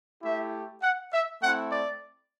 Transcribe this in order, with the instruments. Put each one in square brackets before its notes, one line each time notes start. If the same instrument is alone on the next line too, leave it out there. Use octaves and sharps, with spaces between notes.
[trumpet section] A3 E4 G4 E5
F#5
E5
A3 C4 E4 F#5
D5